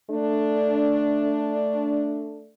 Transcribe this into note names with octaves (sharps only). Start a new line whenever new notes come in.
A3 D4